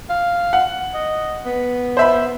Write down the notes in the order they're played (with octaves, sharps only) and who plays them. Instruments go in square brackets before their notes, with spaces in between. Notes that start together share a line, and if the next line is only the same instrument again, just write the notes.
[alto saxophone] F5
[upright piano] F#5
[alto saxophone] D#5
B3
[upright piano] C5 E5 B5